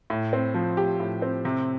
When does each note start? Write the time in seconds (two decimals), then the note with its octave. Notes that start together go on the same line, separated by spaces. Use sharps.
0.10 A2
0.33 C4
0.54 F3
0.77 G4
1.00 A2
1.22 C4
1.45 C3